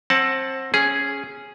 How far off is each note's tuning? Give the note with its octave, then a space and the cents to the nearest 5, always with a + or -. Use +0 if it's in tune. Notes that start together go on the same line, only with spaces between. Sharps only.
C4 +25 F#5 +0 A5 +0
C#4 +0 G#4 +0